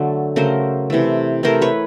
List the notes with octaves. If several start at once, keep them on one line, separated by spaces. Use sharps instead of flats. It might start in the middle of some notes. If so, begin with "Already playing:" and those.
Already playing: D3 F#3 A3
C#3 F#3 A3 A#4 C5
C3 E3 A3
C3 E3 A3 A#4 C5
B4 C#5